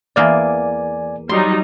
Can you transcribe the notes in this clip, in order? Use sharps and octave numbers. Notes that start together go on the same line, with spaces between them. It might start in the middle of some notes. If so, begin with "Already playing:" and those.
E2 A#3 D5 G5 G#5
F#3 G3 D#4 C6